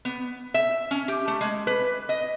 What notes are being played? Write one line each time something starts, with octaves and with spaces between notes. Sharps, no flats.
B3
E5
C#4
G4
A3
G#3
B4
D#5